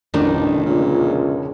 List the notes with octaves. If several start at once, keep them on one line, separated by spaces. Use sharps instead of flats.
A1 F2 B2 D3 D#3 D4
C#2 A#2